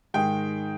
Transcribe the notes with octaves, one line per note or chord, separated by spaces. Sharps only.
G#2 D#3 G#3 G5